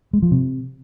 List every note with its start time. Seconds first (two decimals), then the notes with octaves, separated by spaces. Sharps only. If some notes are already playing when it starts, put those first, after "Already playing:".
0.13 G#3
0.22 F3
0.31 C3